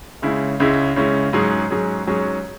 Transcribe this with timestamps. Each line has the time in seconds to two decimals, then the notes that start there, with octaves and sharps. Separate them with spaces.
0.22 C#2 C#3 G#3 C#4 E4
0.60 C#2 C#3 G#3 C#4 E4
0.96 C#2 C#3 G#3 C#4 E4
1.33 G#2 F#3 C#4 G#4
1.70 G#2 F#3 C#4 G#4
2.07 G#2 F#3 C#4 G#4